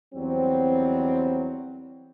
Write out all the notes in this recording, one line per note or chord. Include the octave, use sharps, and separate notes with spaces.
E2 F#3 G3 C4